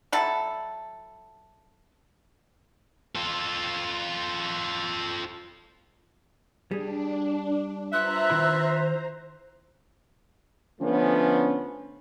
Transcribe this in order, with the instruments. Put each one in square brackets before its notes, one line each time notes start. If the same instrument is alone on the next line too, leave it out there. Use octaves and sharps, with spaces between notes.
[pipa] F#3 E4 A4
[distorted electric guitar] F4 A4
[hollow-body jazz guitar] G3 G#4 [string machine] D4
[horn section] F4 B4 E5 [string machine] C5 A#5 [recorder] F#6
[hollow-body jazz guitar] D#3 E4 B5
[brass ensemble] D3 F3 A3 B3 C#4